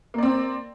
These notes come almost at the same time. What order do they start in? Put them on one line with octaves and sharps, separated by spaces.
A#3 D5 C4